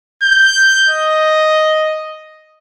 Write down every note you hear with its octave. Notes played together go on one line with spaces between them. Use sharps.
G6
D#5